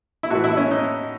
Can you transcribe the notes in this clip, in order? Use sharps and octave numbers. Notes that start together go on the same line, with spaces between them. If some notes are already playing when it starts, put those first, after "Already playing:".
E4
A2 E3 F#4
E4
C#4
D#4